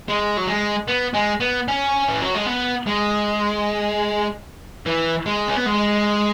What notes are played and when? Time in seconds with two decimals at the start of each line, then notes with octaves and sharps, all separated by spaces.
0.08 G#3
0.37 F#3
0.47 G#3
0.88 B3
1.14 G#3
1.40 B3
1.68 C#4
2.09 E3
2.22 F#3
2.35 G#3
2.47 B3
2.87 G#3
4.86 E3
5.26 G#3
5.48 C#4
5.57 B3
5.66 G#3